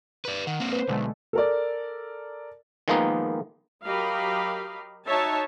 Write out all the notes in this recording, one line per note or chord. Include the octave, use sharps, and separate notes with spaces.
B4 D5
D#3 F#5
A#3 C4
B4 C5
B1 D3 G#3 A3
A4 A#4 D5
D#3 F3 G#3 A#3 B3 D#4
F#3 G4 A#4 D#5 F5 B5
D#4 F#4 C#5 E5 A5